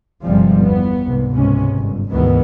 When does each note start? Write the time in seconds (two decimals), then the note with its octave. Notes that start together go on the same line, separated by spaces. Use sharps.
0.24 G1 C3 F3 G3 G#3
0.62 E2 B3
1.05 C2 G#2 C3
1.34 G#1 C#2 C3 G#3 C#4
1.79 G1
2.10 D2 G#2 B2 D#3 E3 B3